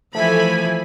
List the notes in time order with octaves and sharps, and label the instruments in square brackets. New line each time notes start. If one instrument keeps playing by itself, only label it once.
[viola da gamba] E3 F3 [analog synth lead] A3 [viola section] A4 G#5 B5